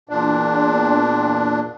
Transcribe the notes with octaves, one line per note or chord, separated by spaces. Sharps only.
E2 A#2 D4